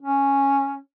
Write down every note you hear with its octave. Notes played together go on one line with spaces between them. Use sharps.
C#4